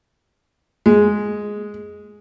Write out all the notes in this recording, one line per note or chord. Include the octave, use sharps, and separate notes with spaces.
G#3